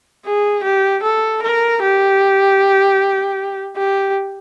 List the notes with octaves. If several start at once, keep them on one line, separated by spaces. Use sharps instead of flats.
G#4
G4
A4
A#4
G4
G4